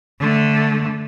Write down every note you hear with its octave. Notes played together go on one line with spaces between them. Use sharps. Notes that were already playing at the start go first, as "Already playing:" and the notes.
D3 A3